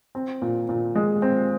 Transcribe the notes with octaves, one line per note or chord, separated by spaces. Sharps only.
C4
A#2
A#2
G#3
C4